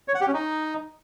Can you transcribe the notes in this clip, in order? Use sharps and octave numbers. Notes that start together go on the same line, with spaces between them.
C#5
F#5
G4
C#4
D#4